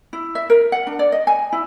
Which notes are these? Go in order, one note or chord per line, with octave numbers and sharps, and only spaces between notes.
E4
E5
A#4
F#5
D4
D5
D#5
G#5
E4